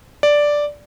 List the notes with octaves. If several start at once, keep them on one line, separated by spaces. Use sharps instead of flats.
D5